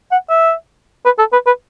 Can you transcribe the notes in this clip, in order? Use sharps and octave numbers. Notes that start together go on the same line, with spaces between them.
F#5
E5
B4
A4
B4
B4